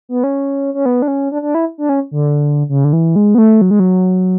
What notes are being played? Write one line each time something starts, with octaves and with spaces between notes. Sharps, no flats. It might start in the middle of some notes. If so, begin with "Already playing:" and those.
B3
C#4
C#4
B3
D4
C#4
D4
D4
E4
D4
C#4
D3
C#3
D3
E3
G#3
B3
A3
F#3
G#3
F#3